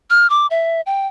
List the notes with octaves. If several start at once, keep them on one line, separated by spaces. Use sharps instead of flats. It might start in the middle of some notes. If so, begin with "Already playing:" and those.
F6
D6
E5
G5